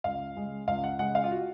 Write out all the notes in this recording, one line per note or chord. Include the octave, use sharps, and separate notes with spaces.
C#2 F5
C#3 G#3
C#2 F5
F#5
C#3 G#3 F#5
F5
F4
F#4